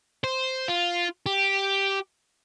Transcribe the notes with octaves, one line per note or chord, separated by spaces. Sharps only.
C5
F4
G4